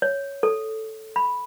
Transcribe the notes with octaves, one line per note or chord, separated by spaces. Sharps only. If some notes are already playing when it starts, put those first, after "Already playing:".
C#5
A4
B5